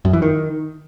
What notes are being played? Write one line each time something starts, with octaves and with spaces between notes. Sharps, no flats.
F#2
E3
D#3